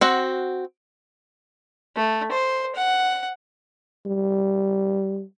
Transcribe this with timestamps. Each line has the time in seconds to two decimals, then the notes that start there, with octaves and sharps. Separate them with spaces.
0.01 C4 F#4 F#5
1.96 A3
2.32 C5
2.75 F#5
4.06 G3